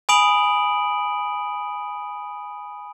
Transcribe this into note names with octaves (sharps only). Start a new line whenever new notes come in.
G#5 B5 D#6 D7 F#7